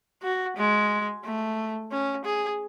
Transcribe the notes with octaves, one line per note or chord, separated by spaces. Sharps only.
F#4
G#3
A3
C#4
G#4